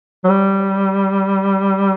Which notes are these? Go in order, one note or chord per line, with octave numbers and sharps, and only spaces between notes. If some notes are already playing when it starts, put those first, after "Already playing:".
F#3
G3